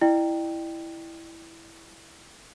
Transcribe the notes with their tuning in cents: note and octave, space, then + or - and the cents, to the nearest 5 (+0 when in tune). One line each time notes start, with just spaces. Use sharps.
E4 +0 D5 +45 G5 +0